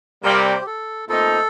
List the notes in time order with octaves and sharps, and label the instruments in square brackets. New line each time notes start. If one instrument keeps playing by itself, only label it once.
[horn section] C3 G3 A#3 [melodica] A#4
[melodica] C5
G4
A4
[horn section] A#2 A3 C4 D#4 [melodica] A4